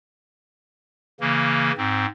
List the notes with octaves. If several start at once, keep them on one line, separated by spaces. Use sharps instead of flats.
C#3 E3 A#3
G#2 C4